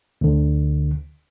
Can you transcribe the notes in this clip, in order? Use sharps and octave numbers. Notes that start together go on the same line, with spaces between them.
D2 D3